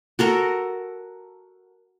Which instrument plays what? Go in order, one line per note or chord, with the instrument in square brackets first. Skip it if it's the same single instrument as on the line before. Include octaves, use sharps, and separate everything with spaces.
[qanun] F#4 A4 A#4